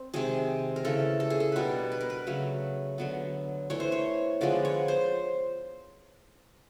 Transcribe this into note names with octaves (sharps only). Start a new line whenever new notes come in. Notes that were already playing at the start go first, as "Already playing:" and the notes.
Already playing: C4
C3 D#3 G#3 G#4
A#4
C#3 E3 A3 A4
A4
G#4
A4
B2 G3 B3 D4 A#4 B4
B4
A#4
B4
C#3 F#3 A3
D3 F#3 B3
E3 A3 D4 C#5
C5
C#5
D3 F3 G#3 B3 D5
C#5
C5